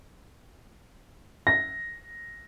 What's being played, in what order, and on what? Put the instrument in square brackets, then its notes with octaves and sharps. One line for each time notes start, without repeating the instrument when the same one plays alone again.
[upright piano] A#6